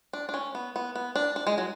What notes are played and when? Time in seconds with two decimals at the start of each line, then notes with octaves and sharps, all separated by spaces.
0.13 D4
0.29 D4
0.34 C#4
0.55 B3
0.76 B3
0.96 B3
1.16 D4
1.36 D4
1.47 G#3
1.58 F#3